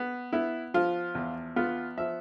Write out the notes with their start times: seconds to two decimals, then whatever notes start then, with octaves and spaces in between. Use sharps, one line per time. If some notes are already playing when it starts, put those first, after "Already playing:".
Already playing: B3
0.33 B3 E4
0.74 F3 F4
1.15 E2
1.56 B3 F4
1.97 F3 E5